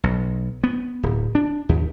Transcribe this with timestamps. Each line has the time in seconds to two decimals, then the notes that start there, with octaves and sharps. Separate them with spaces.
0.04 B1
0.64 B3
1.03 D1
1.35 D4
1.69 D#2